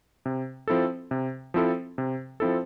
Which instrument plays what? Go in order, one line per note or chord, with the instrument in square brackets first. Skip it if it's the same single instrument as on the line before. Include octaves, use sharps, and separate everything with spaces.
[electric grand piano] C3
F3 C4 E4 A4
C3
F3 C4 E4 A4
C3
F3 C4 E4 A4